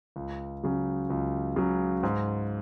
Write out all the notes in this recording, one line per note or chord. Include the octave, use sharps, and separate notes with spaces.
C#2
C#3 F#3
C#2
C#3 F#3
G#2